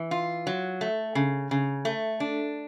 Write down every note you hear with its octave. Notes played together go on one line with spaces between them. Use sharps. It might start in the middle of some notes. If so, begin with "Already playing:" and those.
Already playing: E3
F4
F#3
A3
C#3
C#3
A3
D4